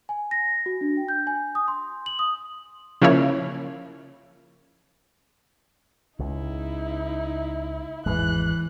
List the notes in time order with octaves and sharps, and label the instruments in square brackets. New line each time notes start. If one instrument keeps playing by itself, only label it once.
[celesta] G#5
A#6
F#4
D4
G5
G6
G#5
D#6
C6
F#7
D#6
[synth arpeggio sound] C#3 F3 A#3 E4 C#5
[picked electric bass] C#2 [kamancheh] D#4 E4
[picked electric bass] G#1 E2 G#3 [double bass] E3 [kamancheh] F#6